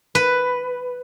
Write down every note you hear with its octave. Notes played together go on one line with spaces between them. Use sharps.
B4